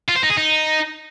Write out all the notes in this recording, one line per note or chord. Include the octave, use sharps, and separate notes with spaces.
F4
C5
D#4
G#4
D#4